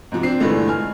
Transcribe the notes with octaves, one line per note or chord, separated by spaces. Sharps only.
G#2 C3 F3
C4 D4 C7
G2 A#2 D3 E3 G#3 A3
G#5 F6